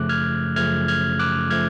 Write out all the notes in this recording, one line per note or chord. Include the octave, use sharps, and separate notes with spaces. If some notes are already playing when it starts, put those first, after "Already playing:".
Already playing: F#2 C#3 F3 A3 D6 F#6
F6 G#6
F#2 C#3 F3 A3 F6 G#6
F6 G#6
D6 F#6
F3 A3 F6 G#6